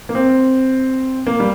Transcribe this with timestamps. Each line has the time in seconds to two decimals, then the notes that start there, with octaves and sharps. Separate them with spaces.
0.09 A#3
0.15 C4
1.26 A#3
1.40 G3